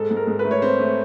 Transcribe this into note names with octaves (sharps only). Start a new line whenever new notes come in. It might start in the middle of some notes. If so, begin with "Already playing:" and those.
Already playing: G#2 A4
G#2
A#4
G#2
B4
A3
C#5
C4 C5
A3